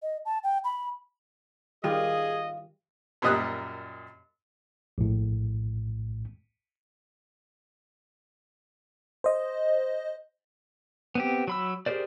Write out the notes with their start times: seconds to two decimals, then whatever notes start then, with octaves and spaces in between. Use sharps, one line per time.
0.02 D#5
0.25 A5
0.44 G5
0.64 B5
1.84 D#3 G3 F4 G4 G#4 D#5
3.22 F#2 A#2 G3 D#5 D#6 F#6
4.98 A#1 A2
9.24 C5 D#5
11.15 B3 C4 G4
11.48 F#3 B5 E6
11.86 G4 G#4 A#4 C5 D5